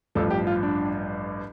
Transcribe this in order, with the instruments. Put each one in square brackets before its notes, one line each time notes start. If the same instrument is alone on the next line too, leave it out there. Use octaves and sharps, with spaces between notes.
[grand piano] A1 G2 F3 A4
G4
F4
D4